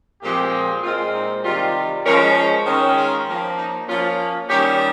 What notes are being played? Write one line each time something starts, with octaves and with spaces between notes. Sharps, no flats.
A#2 F3 G#3 C4 G4
A#2 G#3 C4 F4
D#4
C3 D#3 G3 F4
F3 G#3 C#4 A#4
D#3 G#3 C#4
F4
F3 A#3 C#4
D#4
F3 A#3 C#4 F4
D#3 G3 C#4 G4